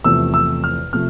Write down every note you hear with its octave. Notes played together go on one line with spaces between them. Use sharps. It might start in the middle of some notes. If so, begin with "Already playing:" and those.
E2 C3 F3 A3 E6
E6
F6
C3 F3 A3 F6